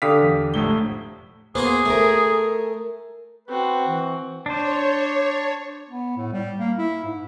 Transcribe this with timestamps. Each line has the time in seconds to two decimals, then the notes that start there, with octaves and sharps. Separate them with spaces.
0.02 D3 G4 F5 D#6 B6
0.22 E2
0.54 F1 A2 G7
1.55 A#3 B3 F#4 G#4 C5
1.85 A3 A4 A#4
3.48 C4 F#4 B4
3.87 E3
4.46 D4 C5 C#5
5.89 B3
6.17 A2
6.32 G3
6.59 A#3
6.78 E4
7.05 G#2